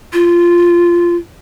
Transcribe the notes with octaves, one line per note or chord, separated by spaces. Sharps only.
F4